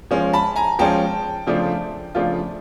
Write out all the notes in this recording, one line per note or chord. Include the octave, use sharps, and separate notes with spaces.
F3 G#3 C#4
A5 B5
G#5 A#5
F3 G#3 C#4 G5 A5
C#3 F3 A3 D4 F4
C#3 F3 A3 D4 F4